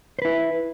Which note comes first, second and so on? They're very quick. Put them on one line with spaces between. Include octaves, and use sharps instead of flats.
C5 B4 E4